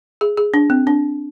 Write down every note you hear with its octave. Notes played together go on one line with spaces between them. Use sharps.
G#4
G#4
D4
C4
D4